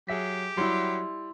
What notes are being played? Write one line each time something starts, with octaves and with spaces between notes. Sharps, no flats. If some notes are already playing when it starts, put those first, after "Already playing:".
F#3 G4 G#4 E5 B6
F#3 G3 E4 C6